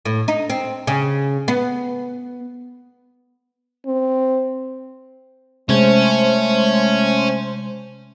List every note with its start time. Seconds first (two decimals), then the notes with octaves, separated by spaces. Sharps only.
0.05 A2
0.28 D#4
0.50 C4
0.87 C#3
1.48 B3
3.86 C4
5.69 C3 G#3 A3 C#4 C5